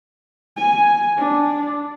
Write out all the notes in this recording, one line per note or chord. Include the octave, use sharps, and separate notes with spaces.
G#5
D4